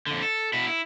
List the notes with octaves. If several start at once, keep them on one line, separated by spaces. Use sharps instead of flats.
F2 D3
A4
B2 E4
E4